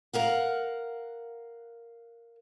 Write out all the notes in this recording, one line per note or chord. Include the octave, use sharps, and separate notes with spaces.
A#4 F5 F#5